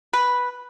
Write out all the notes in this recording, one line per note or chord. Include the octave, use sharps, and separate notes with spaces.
B4